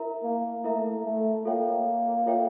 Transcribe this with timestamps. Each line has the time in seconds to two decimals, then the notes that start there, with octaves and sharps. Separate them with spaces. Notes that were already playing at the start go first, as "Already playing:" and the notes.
Already playing: E4 A#4 E5 A#5
0.23 A#3
0.64 A3 E4 A#4 E5 A#5
1.05 A3
1.45 A#3 F4 A4 C#5 E5 G5
2.26 F4 A4 C#5 E5 G5